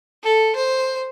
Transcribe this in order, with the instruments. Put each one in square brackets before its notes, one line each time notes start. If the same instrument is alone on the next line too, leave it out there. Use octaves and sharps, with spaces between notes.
[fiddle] A4
C5